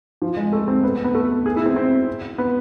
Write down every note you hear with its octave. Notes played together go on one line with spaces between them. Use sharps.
F3
G#3
A3
C4
B3
B3
A3
G#4
E4
C4
C4
B3